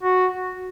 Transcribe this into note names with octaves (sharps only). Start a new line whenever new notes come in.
F#4